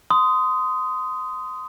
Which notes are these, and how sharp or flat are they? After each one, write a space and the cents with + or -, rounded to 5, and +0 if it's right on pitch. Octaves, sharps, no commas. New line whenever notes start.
C6 -20 D#6 +5